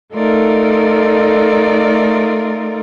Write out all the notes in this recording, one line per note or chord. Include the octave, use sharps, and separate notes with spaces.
A3 D#4 F4 A4 A#4 D5